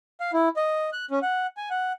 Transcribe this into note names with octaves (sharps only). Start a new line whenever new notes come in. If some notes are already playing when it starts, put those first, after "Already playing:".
F5
E4
D#5
F#6
C#4
F#5
G#5
F#5